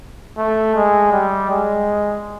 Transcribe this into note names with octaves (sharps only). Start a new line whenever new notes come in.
A3
G#3
G3
G#3